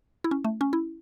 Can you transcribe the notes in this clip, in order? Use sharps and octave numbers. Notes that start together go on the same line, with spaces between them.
E4
C#4
A3
C#4
E4